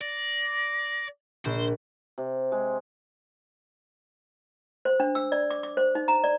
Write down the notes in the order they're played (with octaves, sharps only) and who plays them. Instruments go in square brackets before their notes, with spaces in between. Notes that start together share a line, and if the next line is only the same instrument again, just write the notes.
[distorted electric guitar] D5 [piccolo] A#6
[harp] A#1 [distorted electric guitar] C5
[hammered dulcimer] C3
G#3
[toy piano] C5
D4
E6
D5
D6
D6
C5
D#4
A#5
D5